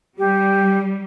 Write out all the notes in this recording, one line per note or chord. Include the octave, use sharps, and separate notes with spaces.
G3 G4